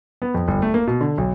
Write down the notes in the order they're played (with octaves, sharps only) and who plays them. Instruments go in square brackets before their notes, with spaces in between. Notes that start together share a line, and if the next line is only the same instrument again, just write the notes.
[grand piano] B3
F2
G1
A3
A#3
B2
D3
B1